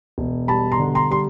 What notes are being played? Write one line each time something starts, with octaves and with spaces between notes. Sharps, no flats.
E1
G3 A5 B5
A#5 C6
D3
A#5 C6
G3 C6